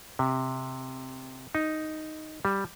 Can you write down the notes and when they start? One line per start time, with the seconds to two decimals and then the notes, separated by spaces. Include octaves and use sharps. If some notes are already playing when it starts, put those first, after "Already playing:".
0.19 C3
1.55 D#4
2.45 G3